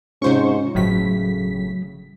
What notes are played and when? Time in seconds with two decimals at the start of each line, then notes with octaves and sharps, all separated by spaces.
0.22 G#2 C3 C#4 F4 C5 C#6
0.75 G1 A2 C#3 F#3 B6